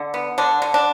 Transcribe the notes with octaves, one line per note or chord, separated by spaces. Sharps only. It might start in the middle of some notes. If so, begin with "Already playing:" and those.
Already playing: D3
B3
D3 D4
D3
D4